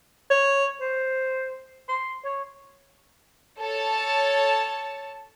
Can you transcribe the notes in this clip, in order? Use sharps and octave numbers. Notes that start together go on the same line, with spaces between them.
C#5
C5
C6
C#5
A4 C#5 A5